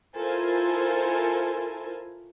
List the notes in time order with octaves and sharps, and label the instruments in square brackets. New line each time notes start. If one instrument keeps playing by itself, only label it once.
[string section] E4 F4 A4 A#4 C5 G#5